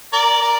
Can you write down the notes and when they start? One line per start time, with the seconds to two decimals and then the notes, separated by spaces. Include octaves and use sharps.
0.13 A#4 D5
0.41 A#4 D5